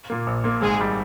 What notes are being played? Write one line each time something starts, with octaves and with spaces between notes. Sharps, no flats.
A#2 A#3
A#1
A#2 A#3
G#1 G#3 G#4
G3